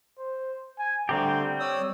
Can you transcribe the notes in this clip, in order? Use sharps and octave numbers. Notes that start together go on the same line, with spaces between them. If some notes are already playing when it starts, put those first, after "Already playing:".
C5
G#5
D3 G3 A3 C4 G4 A#5
C#5 D5 D#6 E6